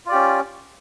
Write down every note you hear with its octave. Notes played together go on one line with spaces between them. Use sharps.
C#4 F4 G4 D5